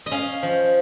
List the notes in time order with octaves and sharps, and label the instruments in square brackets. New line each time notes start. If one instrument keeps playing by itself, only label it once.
[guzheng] D#5
C#4 F5
F3